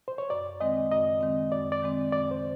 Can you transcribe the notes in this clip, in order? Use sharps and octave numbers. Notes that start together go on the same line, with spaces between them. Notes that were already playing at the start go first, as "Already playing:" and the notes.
C5
C#5
F#2 D5
D#3 G#3 C4 D#5
F#2 D#5
D#3 G#3 C4
F#2 D5
D5
D#3 G#3 C4
F#2 D5
C5